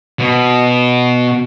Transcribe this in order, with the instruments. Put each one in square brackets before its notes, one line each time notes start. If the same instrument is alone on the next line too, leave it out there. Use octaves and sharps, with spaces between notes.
[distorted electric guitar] B2